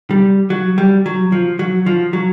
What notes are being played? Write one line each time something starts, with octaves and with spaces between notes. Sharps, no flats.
G3
F#3
G3
F#3
F3
F#3
F3
F#3